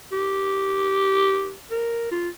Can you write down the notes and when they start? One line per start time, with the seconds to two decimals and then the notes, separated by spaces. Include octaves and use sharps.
0.12 G4
1.71 A#4
2.12 F4